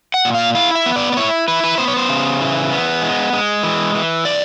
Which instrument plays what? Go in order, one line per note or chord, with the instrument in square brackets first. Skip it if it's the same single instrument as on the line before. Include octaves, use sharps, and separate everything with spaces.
[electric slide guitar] F#5
A#2
F5
E4 F5
E5
B3
D5
D5
E4 C#5
E4 B4
B4
B3 C5
C#5
C5
C#3
E3
B3
G#3
G#3
E3
E3
D5